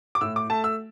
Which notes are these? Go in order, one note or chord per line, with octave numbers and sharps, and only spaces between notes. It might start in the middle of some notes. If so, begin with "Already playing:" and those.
D6
A2 E6
D6
A3 A5
E6